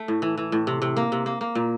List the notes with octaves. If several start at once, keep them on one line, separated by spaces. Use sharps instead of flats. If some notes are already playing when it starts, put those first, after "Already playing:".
Already playing: A3
A2
E3
E3
A2
C3
C3
A#3
C3
A#3
A#3
A#2